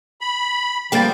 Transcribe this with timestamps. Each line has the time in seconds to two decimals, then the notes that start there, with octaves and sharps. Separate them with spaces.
0.21 B5
0.92 D3 F3 G3 A#3 G5 A6